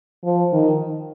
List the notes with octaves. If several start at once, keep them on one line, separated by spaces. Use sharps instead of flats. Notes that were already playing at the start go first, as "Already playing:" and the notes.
F3
D#3